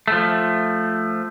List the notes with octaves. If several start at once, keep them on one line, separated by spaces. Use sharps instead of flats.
F3 A3